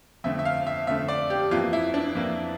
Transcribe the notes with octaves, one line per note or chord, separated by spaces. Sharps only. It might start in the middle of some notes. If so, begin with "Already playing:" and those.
F2 D3 A3 E5
E5
F5
E5
F2 D3 A3 E5
D5
G4
F2 E3 A#3 F4
E4
D4
F2 E3 A#3